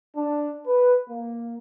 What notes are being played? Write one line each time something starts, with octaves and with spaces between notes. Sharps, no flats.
D4
B4
A#3